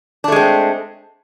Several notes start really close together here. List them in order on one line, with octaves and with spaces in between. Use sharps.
D4 A3 G#3 C4